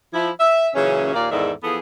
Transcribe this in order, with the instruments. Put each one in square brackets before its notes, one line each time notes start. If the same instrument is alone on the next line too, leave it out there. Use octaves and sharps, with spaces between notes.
[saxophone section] F3 E4
E5
A#2 C#3 E3 F#3 C#4
D#2 A#2 A#3 D5 F5
E2 G#2 D#3 A4 D5 E5
E3 F3 B3 G#4 A4